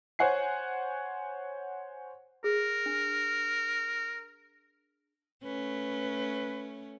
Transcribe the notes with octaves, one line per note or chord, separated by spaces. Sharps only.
C5 C#5 F#5 G#5 C7
G#4 A#4
D4
A3 C#4 B4